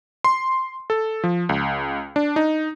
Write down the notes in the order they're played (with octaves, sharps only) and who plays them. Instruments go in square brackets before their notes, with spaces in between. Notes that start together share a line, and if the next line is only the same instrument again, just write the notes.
[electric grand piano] C6
A4
F3
C#2
D4
D#4